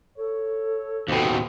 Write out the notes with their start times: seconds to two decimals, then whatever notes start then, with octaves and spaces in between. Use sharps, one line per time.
0.17 A4 C#5
1.09 D#2 B2 C4